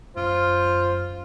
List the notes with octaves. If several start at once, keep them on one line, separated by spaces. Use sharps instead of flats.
F#2 F4 C5